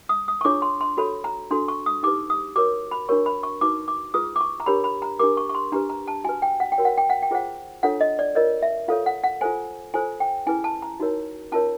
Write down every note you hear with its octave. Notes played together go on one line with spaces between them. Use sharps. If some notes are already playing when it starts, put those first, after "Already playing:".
D#6
D#6
C#6
D4 F4 G#4 C#5 D6
C6
C6
F#4 A4 C#5 B5
A#5
D4 F#4 A4 C6
C#6
D#6
D#4 G4 B4 D6
D#6
F#4 A#4 C#5 D6
B5
D4 F#4 A#4 C#5 C#6
B5
C#6
D#4 F#4 B4 D6
D6
F4 G#4 B4 D#6
D6
C#6
A#5
D4 G4 A#4 C#5 B5
B5
A#5
D4 G4 A#4 D6
C#6
C#6
C6
D4 G4 B4 A#5
A#5
A5
F#4 B4 G#5
G5
F#5
G5
F#4 A#4 C#5
F#5
G5
F#5
G5
F4 G#4 C5 F#5
D4 F4 A4 C#5 F#5
D#5
D5
F4 A#4 C#5 D#5
E5
F4 A4 C#5 F5
F#5
F#5
F4 A4 C5 G#5
F4 A4 C5 G#5
G5
C#4 E4 G#4 B4 G#5
A5
A#5
D#4 F#4 A#4 C#5
C#4 F4 A#4 C#5 A5